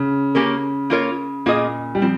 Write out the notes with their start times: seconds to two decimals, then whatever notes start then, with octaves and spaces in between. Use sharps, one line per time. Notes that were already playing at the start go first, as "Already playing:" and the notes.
Already playing: C#3
0.35 A#3 C#4 G4 A#4
0.90 A#3 F4 A#4 C#5
1.46 A#2 A#3 F4 G#4 D#5
1.95 G3
2.02 F3 C4